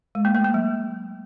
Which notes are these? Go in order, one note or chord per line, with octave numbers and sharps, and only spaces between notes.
G#3
A#3
A3
A#3
F#3